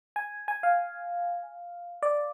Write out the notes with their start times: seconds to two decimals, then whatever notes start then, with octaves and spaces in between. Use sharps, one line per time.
0.16 G#5
0.48 G#5
0.63 F5
2.03 D5